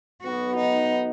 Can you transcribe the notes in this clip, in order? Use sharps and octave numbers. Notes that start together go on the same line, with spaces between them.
B1 B2 B3 F#4
D#4